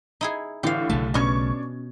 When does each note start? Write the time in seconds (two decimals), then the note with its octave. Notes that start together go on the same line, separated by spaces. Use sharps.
0.21 D#4 E4 G#4
0.63 A2 D3 E3 G4 F5
0.89 B1 C#3 A3 A5
1.14 B2 C#4 D4 C#6 G#6